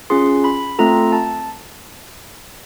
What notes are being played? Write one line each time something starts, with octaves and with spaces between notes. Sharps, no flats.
C#4 F4 G#4 C6
B5
A3 C4 F4 A4 A#5
A5